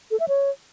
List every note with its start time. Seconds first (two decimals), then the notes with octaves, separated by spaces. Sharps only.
0.11 A4
0.20 E5
0.28 C#5